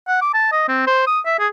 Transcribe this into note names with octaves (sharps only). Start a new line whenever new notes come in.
F#5
D6
A5
D#5
C4
C5
D#6
E5
G#4